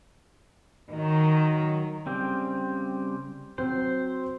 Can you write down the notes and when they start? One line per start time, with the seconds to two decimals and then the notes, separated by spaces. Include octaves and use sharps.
0.89 D#3 F#3
2.06 C#3 G3 C4
3.58 F#3 C4 F#4 C5